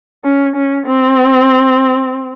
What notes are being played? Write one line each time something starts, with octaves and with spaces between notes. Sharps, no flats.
C#4
C#4
C4